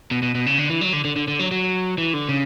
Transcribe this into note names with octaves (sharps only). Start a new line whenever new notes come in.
B2
B2
B2
C#3
D3
E3
F#3
D3
D3
D3
D3
F#3
F#3
E3
D3
C#3